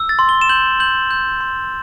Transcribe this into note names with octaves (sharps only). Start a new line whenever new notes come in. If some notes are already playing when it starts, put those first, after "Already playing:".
Already playing: E6
A6
C6
G7
E7
G6 F#7
G6 F#7
G6
C6